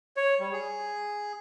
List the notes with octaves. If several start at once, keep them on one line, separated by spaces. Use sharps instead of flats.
C#5
G3
G#4